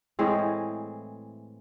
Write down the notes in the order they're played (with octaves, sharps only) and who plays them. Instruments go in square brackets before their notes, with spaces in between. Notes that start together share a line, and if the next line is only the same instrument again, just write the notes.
[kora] A2 E3 G#3 C4